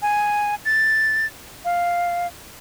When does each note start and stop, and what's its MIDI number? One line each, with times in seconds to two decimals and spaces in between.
0.02 0.55 80
0.65 1.27 93
1.65 2.27 77